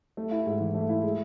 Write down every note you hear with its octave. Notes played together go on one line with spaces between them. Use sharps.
A3
E4
G#2
E3
A3
E4
G#3